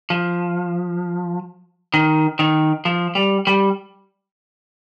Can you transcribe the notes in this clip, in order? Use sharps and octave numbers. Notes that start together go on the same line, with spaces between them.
F3
D#3
D#3
F3
G3
G3